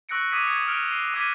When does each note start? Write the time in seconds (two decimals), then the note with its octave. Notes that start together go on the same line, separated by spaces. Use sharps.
0.09 C#6 E6 F#6 A#6 C#7 D7
0.31 D6 D#6 G#6 B6 D#7
0.46 D#6 G#6 C#7 E7
0.68 F6 B6 C#7 D7 F7
0.92 C7
1.14 D6 D#6 F#6 G#6 B6 D#7